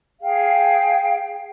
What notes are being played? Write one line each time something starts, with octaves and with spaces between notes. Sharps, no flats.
G#4 F5 G5